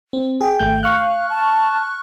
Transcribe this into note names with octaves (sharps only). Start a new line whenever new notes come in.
C4
G#4 G5
G#1 A3 G6
F5 C#6 F6 F#6
A5